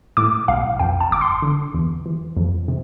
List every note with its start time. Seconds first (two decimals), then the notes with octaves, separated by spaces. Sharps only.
0.17 A2 D6
0.48 B1 F5
0.79 F2 G5
1.00 A5
1.11 G1 D6
1.21 C6
1.42 D3
1.74 E2
2.06 E3
2.37 F2
2.68 C3